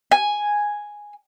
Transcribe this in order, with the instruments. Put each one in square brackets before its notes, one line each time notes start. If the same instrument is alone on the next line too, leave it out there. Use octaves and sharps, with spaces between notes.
[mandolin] G#5